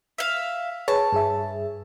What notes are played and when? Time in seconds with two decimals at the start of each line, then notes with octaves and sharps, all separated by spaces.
0.18 E5 F5
0.88 G#4 B4 C#5 A5
1.12 G2 G#4 E5